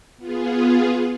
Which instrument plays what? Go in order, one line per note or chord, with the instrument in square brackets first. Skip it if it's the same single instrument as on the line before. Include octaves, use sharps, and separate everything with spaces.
[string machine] B3 F4 G#4